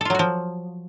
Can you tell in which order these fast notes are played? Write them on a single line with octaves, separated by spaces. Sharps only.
A4 F4 F#3 F#4 F3